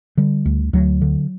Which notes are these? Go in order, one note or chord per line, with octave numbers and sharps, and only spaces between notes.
D3 G3
D2
D2 F#3
D3